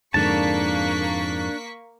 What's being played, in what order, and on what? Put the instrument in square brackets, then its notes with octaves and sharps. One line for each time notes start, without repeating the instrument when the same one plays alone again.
[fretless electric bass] F2 G#2 D3 [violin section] A#3 C#6 B6 [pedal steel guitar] D4 A5